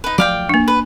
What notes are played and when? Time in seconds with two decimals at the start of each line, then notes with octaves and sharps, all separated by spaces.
0.04 D#4 B4
0.18 F3 F#3 A3 D5 F5 G5
0.49 A#3 D4
0.68 B4